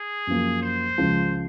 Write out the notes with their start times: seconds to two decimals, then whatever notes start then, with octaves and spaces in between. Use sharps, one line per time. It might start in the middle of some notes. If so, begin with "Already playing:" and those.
Already playing: G#4
0.27 F#2 F3 A#3
0.62 C5
0.98 C#2 C#3 F3